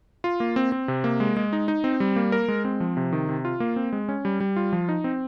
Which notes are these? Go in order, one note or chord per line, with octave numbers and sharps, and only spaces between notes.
F4
A#3
C4
C4
C3
A#3
G#3
G#3
D#4
D#4
C4
G3
A#3
A#4
G#3
C4
F3
C3
D#3
C3
F4
A#3
C4
G#3
C#4
G3
G3
F4
F3
D#4
C4